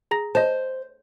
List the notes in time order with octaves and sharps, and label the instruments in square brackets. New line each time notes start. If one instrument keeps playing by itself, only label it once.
[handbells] G#4 A#5 A#6
[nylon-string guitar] C5 [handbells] D#5 A5